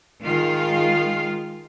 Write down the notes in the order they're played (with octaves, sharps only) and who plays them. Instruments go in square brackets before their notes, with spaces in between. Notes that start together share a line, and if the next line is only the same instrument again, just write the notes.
[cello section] D#3 G#3 F4 F5